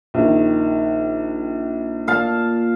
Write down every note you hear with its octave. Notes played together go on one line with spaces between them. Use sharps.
A#1 D#3
A#2 F5 A5